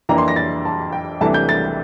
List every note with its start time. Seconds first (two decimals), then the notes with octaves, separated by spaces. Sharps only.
0.09 F2 E3 A#3 D4 A#5
0.18 C6
0.28 A#6
0.36 A6
0.65 A5
0.92 G5
1.21 C2 C3 E3 A3 D4 A5
1.34 G6
1.49 A6